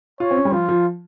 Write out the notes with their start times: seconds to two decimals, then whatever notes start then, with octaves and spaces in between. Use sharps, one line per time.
0.20 F4 C#5
0.31 C4
0.37 C#4
0.45 G3
0.52 F3 F4
0.69 F3